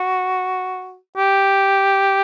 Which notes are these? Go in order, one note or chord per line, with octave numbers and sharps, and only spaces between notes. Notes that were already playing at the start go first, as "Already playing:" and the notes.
Already playing: F#4
G4